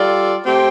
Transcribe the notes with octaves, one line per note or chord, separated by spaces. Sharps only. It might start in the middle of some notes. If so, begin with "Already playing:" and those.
Already playing: G3 F4 A4 D5
A3 C4 G4